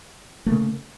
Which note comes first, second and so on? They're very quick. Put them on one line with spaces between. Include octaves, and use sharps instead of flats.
A3 A#3 C#3